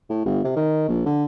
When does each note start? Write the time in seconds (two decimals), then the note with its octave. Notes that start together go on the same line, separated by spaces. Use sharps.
0.09 A2
0.25 G1
0.44 C3
0.56 D#3
0.88 A#1
1.05 D3